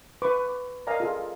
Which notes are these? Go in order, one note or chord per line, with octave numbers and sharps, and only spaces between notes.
B4 B5 C#6 D6
D6
A#4 D5 D#5 F5 G#5 A#5
F4 G#4 A4